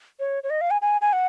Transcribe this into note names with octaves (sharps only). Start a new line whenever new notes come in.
C#5
C#5
D#5
F5
G#5
G#5
G#5
F#5